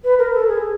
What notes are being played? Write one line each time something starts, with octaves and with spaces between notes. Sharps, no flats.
B4
A#4
A4
G#4